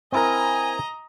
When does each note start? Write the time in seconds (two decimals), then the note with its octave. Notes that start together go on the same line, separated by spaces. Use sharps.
0.12 C4 E4 A#4 D#5 G#5 A#5